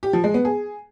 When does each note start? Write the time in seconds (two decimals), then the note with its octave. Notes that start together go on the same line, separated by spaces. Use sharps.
0.03 G4
0.13 F3
0.24 G#3
0.34 B3
0.45 G#4